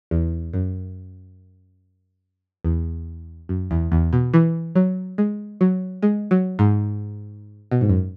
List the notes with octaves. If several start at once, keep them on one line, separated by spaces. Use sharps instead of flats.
E2
F#2
E2
F#2
E2
E2
B2
E3
F#3
G#3
F#3
G#3
F#3
G#2
B2
G#2
F#2